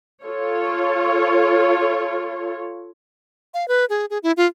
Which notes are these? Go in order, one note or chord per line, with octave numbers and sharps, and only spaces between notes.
F4 A4 C#5
F5
B4
G#4
G#4
E4
F4